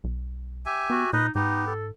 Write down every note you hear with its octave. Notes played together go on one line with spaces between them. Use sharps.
B1
G4 E5 G#5
B3 F#4
A#2 D#4 B4 D#5
G#2 B3 D#4 G4
A4